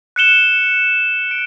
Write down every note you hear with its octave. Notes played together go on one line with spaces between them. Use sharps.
F#6 C#7 E7 G7
D7